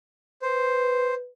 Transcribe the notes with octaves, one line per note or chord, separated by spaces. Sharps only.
B4 C5